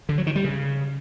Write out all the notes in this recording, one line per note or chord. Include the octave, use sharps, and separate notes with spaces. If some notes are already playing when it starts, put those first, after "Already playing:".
D3
F#3
D#3
G3
C#3